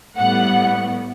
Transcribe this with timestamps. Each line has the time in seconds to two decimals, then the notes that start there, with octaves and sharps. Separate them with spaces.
0.17 A2 G3 B3 F#5